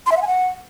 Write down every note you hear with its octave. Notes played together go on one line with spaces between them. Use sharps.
C6
E5
F#5
G#5
F#5